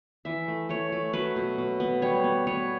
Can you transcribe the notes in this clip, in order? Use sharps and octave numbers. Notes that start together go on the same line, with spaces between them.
E3 E5
A3
A3 C#5
A3
F#3 B4
B2
B2
B3
G3 C#5
B3
B3 C#5